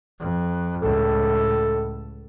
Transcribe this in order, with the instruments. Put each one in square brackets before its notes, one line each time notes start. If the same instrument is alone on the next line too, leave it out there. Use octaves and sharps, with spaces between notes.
[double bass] F2
[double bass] C#2 A2 [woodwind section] A4